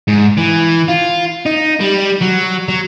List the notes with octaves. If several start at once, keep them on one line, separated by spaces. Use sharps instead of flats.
G#2
E3
F4
D#4
G3
F#3
F#3